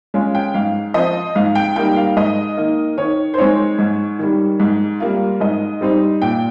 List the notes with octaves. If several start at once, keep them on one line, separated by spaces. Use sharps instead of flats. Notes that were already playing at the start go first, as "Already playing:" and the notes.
G#3 C#4 F4
G5
G#2 F5
F3 C4 D#5
G#2 F5
G5
G3 A#3 D#4 G5
F5
G#2 D#5
D#3 A#3
D#3 C#5
C5
G#3 C4 D#4 C#5
G#2
D#3 G3
G#2
G3 A#3 F4
G#2 D#5
G3 C4 D#4
A#2 G5